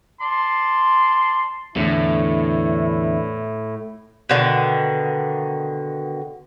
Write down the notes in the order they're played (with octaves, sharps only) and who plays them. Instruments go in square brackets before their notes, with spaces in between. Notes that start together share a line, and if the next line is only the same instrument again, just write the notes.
[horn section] D5 A5 C6
[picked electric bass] E2 D3 [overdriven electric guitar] A2 [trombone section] E3 D4 E4
[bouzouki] B2 D3 D#3